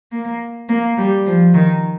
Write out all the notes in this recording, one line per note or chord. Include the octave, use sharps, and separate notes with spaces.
A#3
A#3
G3
F3
D#3